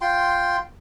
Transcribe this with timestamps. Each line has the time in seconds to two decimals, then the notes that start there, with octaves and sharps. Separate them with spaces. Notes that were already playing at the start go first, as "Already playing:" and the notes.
0.01 F4 G5 C6